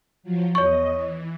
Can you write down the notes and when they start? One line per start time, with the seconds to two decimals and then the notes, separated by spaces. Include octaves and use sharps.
0.23 F3 F#3
0.55 E2 C#5 D#5 C#6
0.92 E3